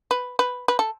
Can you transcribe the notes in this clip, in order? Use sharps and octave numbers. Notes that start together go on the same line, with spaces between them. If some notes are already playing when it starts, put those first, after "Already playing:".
B4
B4
B4
A4